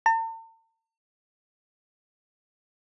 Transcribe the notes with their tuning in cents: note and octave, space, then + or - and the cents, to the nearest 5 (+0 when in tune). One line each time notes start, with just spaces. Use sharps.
A5 +45